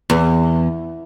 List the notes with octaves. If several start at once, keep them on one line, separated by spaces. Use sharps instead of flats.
E2